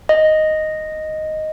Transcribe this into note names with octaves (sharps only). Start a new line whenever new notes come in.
D#5